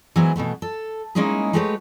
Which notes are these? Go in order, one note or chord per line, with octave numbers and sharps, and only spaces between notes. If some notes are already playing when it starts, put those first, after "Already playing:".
E3 F#3 G#3 B3 G#4 C5
B2 E3 A3 B3
A4
G#3 A#3 C#4 D#4 E4 G#4
G#3 A3 F#4 G4 B4 C#5